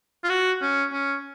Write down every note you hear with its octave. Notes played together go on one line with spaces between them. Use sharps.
F4
F#4
C#4
C#4